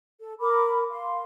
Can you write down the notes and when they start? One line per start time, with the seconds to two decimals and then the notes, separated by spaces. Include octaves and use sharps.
0.21 A4
0.40 A#4 B5 D6
0.90 F5 C6